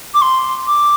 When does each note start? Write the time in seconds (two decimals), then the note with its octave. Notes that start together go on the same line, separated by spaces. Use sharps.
0.14 D6
0.21 C6
0.66 D6